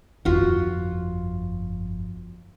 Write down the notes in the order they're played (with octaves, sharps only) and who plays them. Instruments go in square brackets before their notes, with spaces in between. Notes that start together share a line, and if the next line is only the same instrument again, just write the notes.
[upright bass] G1 F2 [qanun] F4 F#4